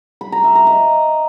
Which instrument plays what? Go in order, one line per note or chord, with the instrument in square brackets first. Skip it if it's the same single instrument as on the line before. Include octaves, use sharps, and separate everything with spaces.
[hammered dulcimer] B5
A#5
E5
A#5
D#5